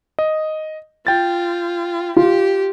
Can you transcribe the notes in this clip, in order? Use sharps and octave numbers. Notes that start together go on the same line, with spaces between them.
D#5
F4 G5 A6
F4 G4